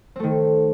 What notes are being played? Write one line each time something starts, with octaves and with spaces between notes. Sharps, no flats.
D#3 A3 C4